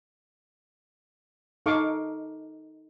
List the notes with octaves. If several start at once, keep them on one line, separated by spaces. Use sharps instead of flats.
D#4 A4 F5 C#6 D6